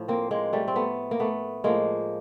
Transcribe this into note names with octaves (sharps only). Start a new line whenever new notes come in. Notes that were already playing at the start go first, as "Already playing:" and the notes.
Already playing: A2 F3
A#3 C4
G#3 A#3
G3 A3
C4
A3 B3
A#3
A3 B3
A2 F3 G#3 A#3